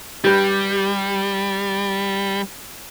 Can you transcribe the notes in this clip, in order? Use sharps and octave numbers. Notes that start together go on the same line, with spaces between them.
G3 G4 B4